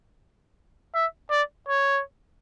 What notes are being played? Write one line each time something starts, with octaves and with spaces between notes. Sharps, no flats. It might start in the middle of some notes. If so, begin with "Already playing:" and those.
E5
D5
C#5